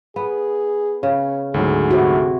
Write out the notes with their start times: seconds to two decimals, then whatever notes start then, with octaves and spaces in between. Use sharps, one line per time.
0.16 B3 G#4
1.03 C#3 C#4
1.54 D2 G#2 F#3 G#4
1.91 C3 E4 F#4